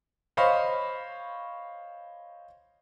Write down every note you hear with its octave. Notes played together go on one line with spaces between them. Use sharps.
C5 C#5 D#5 F5 B5 C#6